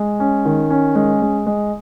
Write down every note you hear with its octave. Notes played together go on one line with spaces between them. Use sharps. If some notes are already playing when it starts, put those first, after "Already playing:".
Already playing: G#3
C#4
D#3
C#4
G#3
G#3
G#3